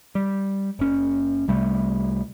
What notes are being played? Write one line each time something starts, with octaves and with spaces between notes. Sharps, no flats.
G3
F#1 C#4
C2 C3 G3 A3